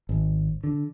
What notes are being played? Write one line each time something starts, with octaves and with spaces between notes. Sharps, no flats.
G#1
D3